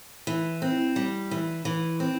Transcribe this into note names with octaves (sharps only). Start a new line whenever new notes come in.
E3
C4
G3
E3
E3
C4